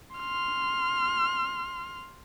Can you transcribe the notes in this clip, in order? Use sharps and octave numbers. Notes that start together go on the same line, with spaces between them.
C6 F6